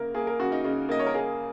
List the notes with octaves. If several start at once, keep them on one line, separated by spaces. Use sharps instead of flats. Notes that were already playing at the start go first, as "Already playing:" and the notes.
Already playing: C#3 A#3 A#4
A#3 G#4
A#4
C#3 F#4
D#4
C#3 D#4
A#3 D#5
C#5
A#4
A#3 G#4